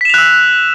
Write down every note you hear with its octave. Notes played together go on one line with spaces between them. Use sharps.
E6 F#6 B6 E7 F7